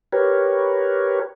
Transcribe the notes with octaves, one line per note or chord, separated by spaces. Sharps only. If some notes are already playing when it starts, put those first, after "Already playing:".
G4 A#4 B4 C#5